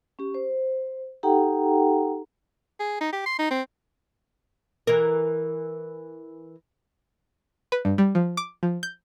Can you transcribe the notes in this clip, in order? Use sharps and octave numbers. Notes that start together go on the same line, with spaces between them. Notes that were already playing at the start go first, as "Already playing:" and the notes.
C#4 G4
C5
D#4 G4 A4 F#5 G5 A#5
G#4
D#4
G4
C6
D#4
C4
E3 A#4
B4
G2
G3
F3
D6
F3
G6